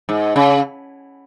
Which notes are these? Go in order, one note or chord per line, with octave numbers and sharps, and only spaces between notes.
G#2
C#3